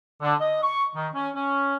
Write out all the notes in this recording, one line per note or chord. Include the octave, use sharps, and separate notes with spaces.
D3
D#5
C#6
D#3
C#4
C#4